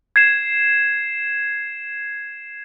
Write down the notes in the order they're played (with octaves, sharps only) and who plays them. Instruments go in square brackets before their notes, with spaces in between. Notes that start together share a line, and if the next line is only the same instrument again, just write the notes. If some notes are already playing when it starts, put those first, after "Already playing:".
[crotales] G#6 C7 E7